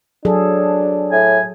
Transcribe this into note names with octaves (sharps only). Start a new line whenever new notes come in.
F#3 D4 G#4 A4
A2 G#5